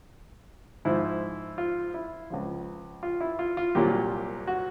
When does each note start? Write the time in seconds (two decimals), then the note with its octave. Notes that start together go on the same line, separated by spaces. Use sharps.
0.85 G#2 F3 E4
1.58 F4
1.94 E4
2.30 C#2 C#3 F3
3.03 F4
3.21 E4
3.39 F4
3.57 F4
3.75 C2 A#2 F#3 G4
4.47 F#4